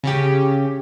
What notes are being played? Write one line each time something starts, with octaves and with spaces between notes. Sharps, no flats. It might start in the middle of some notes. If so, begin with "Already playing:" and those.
C#3 C#4 G4